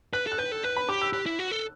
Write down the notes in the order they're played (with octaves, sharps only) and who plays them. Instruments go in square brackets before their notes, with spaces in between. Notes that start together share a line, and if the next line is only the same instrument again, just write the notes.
[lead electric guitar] B4 [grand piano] F#6
[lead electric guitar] A4
[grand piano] F#6
[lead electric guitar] B4 [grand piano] G6
[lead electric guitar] A4
[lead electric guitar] B4 [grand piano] F#6
[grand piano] B5
[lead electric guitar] G4 [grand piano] D6
[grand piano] E6
[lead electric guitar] G4 [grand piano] F#6
[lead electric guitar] E4
F#4
A4